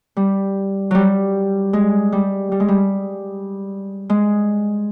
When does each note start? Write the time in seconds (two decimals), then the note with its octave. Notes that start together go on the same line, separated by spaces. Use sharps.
0.17 G3
0.91 F#3 G3
1.73 G#3
2.12 G3
2.52 G3
2.60 G#3
2.68 G3
4.10 G#3